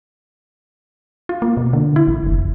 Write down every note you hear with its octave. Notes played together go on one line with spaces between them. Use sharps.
F4
A#3
B2
D3
E4
A1
F1